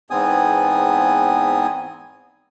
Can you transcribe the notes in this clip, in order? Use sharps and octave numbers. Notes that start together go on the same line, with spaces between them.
E2 G#2 B3 C4 G#5 D#6